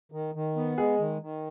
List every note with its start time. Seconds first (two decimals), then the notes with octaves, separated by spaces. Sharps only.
0.12 D#3
0.35 D#3
0.56 B3
0.78 G#3 G#4
0.99 D#3
1.22 D#3